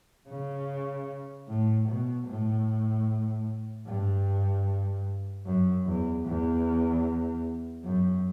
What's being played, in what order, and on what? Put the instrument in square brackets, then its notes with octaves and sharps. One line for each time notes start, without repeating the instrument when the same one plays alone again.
[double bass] C#3
A2
B2
A2
G2
F#2
E2
E2
F#2